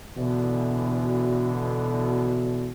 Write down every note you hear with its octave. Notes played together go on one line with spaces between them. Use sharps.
B2 D3 E3